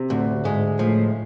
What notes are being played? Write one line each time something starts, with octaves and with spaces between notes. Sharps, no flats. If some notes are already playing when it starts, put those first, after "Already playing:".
Already playing: C3
D2 A2
G#2 G#3
A2 F3